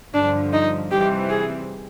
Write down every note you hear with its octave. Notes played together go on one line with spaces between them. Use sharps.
G2 D3 F3 D4
D#4
C3 E3 G3 C4 G4
G#4